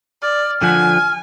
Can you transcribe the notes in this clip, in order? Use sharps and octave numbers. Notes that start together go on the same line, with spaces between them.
D5 F6
D3 F3 F#5 G#5